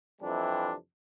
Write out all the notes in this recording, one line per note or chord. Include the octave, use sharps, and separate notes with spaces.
F2 C3 E3 G3 D4